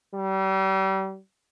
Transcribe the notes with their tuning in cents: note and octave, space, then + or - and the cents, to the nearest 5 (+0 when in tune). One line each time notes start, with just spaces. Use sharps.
G3 -35